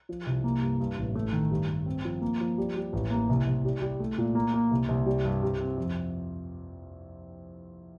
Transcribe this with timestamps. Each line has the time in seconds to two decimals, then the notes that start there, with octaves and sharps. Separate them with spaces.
0.09 F3
0.27 C2
0.44 A#3
0.62 G2
0.80 G2
0.98 A1
1.15 A3
1.33 D#3
1.51 G2
1.69 G2
1.86 C4
2.05 F3
2.21 A#3
2.40 F3
2.58 G3
2.76 G3
2.93 A1
3.11 A#3
3.29 C2
3.47 C2
3.65 G3
3.82 G3
4.00 A3
4.18 A#2
4.35 A#3
4.54 A#3
4.71 C2
4.89 C2
5.06 G3
5.24 G2
5.43 C3
5.60 C4
5.78 F2